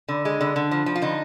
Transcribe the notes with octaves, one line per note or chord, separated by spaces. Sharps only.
D3
G#3
D3
D3
F3
F3
F4
D3 D#4